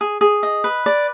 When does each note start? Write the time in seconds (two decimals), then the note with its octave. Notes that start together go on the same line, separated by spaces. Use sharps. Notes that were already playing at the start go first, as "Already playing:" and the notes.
0.01 G#4
0.21 G#4
0.43 D#5
0.64 B4
0.86 D5